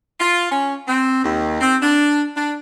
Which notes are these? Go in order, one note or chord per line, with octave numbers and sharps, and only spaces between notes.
F4
C#4
C4
D#2
C4
D4
D4